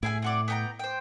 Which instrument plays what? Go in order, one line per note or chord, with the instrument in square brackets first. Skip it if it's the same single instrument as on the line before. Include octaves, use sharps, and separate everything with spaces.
[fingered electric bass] A2 [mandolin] E4 G#4 G#5
[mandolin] C4 F#4 D5
B3 G5 A#5
C5 G5